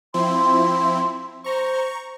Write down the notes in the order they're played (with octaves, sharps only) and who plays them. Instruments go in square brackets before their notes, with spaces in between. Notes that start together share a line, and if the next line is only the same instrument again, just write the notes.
[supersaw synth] F3 C4 E4 [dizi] C6
[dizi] C5 [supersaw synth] A#5 C#6